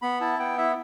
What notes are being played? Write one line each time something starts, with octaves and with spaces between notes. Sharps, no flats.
B3 B5
E4 A5
B3 G5
E4 E5